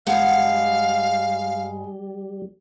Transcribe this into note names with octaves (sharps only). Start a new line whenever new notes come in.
G2 G3 G#3 F5 F#5